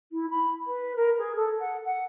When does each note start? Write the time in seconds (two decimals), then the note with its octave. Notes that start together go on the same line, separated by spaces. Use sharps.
0.11 E4
0.30 B5
0.67 B4
0.96 A#4
1.18 G#4
1.35 A4
1.59 F#5
1.84 F#5